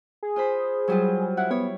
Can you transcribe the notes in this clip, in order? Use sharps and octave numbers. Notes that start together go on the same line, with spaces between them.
G#4
F4 C5 B5
F#3 G3 F4
E4 F#5
B3 C#5